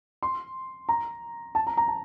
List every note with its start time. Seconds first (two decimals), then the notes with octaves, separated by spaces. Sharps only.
0.23 C6
0.89 A#5
1.55 A5
1.67 A#5
1.77 A#5
1.88 A5